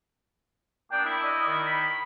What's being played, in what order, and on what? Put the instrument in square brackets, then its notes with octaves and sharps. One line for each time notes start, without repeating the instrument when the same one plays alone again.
[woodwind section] A#3 B3 D4 [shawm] G5
[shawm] E4
[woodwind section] D5 D#5
D#3
[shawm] B5